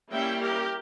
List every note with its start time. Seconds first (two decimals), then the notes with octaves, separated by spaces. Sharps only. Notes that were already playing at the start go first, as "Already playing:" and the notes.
0.12 G3 A#3 C#4 E4 E5 G5
0.41 G4 A#4